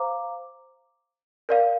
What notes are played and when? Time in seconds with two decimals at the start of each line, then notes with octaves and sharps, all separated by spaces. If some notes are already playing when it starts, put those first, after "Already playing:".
Already playing: C5 F5 A#5 D6
1.49 A#4 D5 F5